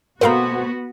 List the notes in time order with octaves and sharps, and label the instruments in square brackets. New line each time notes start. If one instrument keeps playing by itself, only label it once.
[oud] B2 A3 C4 [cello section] B3 F#4 [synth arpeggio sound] A#4 F5 A#5